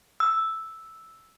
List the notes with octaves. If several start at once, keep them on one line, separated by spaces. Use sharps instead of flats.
E6